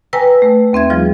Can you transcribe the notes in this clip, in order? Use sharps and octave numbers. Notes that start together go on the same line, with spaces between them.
B4 G5 G#5 A#5 E6 A#6
A3
D#2 C4 E5 G#6
F3 G3 F4 G#4